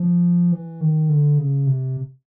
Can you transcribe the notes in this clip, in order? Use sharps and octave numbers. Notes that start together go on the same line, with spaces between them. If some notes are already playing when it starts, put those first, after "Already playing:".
Already playing: F3
E3
D#3
D3
C#3
C3